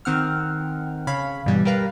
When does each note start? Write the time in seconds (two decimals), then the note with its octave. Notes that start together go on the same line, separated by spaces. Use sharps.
0.05 D#3 C4 F#5 F6
1.07 C#3 C#5 F5 B5
1.46 G2 B2 E3 G3
1.65 G3 G4 A#4 B4 F5 A#5